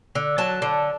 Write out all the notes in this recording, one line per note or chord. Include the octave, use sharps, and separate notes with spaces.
D3
F#3 A5
D3